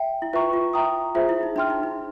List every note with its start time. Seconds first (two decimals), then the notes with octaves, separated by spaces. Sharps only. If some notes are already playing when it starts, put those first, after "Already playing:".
Already playing: E5 G5
0.22 E4
0.33 F4 B4 E5 G5 A#5 C#6
0.53 F4
0.74 E5 G5 A#5 D#6
1.15 F4 G#4 C5 E5
1.29 E4
1.43 D#4
1.56 D4 E5 G5 C6 F6
1.70 D#4
1.83 D#4